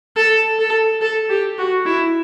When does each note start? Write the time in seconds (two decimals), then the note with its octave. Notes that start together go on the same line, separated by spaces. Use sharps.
0.16 A4
0.59 A4
1.01 A4
1.30 G4
1.58 F#4
1.86 E4